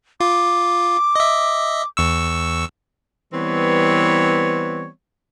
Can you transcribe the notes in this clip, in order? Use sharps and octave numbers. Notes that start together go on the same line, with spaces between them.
F4 D6
D#5 E5
E2 C#6 E6
E3 G3 B3 C4 C#5